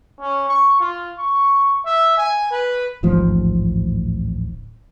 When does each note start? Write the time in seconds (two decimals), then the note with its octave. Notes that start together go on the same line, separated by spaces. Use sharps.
0.19 C#4
0.48 C#6
0.80 F4
1.18 C#6
1.85 E5
2.17 G#5
2.51 B4
3.03 D1 A1 G#2 F3